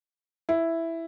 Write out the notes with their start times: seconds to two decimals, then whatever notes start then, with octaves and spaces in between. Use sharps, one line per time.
0.49 E4